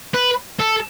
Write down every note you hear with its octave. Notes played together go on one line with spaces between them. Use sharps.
B4
A4